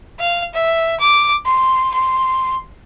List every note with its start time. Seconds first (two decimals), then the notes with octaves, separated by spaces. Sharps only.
0.19 F5
0.54 E5
1.00 D6
1.46 C6
1.94 C6